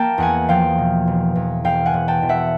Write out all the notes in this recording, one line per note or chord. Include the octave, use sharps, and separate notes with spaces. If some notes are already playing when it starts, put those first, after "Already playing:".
Already playing: A#3 G5 A5
E2 F#5 G#5
F3 F5 G5
B2
E1
E2
E1 F5 G5
F#5 G#5
E1
G5 A5
E1
E5 F#5